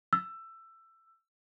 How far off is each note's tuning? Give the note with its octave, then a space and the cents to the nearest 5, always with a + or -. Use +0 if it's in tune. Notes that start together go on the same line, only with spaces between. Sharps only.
E6 +15